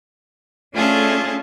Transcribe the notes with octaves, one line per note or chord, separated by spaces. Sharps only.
A3 C#4 D4 F4 G#4 A4